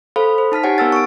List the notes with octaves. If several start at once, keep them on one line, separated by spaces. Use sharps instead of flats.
A4 C5 F5 B5
C5
D#4 A5 F6 B6
D#4 G4 C#5 F#5 G#5 A5
B3 A#4 F#5 E6 F6 A6
C#6 D7